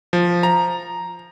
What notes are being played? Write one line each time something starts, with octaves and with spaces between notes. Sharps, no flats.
F3
A#5